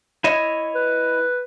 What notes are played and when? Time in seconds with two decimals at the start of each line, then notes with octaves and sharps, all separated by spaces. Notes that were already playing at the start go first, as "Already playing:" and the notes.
0.24 E4 C#5 D#5
0.75 B4